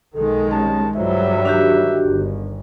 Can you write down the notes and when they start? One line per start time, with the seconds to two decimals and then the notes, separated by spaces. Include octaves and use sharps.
0.15 B1 D#3 G#3 A4
0.52 C3 G3 C#4 A5
0.95 G2 D3 F#3 G3 F4 C5 E5
1.45 D3 D#3 D4 F#4 G4
2.03 G1